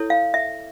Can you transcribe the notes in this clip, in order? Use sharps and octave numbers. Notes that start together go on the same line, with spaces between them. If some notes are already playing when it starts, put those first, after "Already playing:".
Already playing: E4 A4 C#5
F5
E5